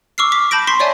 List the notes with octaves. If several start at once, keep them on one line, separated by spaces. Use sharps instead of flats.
C#6 D6 E6 F6 C7
D6 B6
A5 B5 G6 A#6 D7
A5 C6 C#6 B6 C7
C#5 D5 E5 G#5